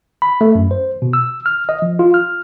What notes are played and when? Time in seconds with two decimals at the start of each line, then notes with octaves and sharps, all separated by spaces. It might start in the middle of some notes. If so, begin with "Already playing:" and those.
0.22 B5
0.41 A3
0.55 F#2
0.71 C5
1.02 B2
1.13 E6
1.46 F6
1.69 D#5
1.82 F3
1.99 F4
2.14 F6